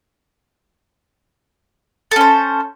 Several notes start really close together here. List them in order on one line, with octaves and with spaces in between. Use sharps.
A4 C#4 C5